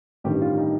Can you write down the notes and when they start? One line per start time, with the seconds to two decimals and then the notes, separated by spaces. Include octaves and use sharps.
0.24 A1 G2 D#3 G3 G4
0.41 F4
0.57 D#4